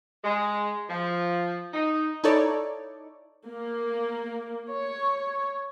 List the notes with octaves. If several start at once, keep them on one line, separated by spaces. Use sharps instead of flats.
G#3
F3
D#4
D#4 E4 A4 C#5 D5
A#3
C#5